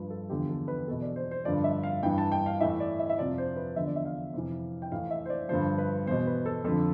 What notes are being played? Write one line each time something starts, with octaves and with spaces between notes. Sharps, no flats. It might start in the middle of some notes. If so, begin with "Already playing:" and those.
Already playing: G2 F3 B4
A4
E2 D3 F3 G4
A4
B4
E2 B2 A4
D5
C5
C5
G2 D3 F3 D5
E5
F5
G2 E3 G5
A5
G5
F5
A2 E3 E5
D5
E5
E5
F2 C3 F3 D5
C5
B4
E2 D3 F3 E5
D5
E5
F5
F2 C3 E3
G5
A2 E3 F5
E5
C5
D5
G2 D3 F3 C5
B4
E2 B2 C5
B4
A4
F2 D3 F3 A4